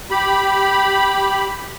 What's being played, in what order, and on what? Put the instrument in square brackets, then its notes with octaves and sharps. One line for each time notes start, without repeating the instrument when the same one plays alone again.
[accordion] G4 B5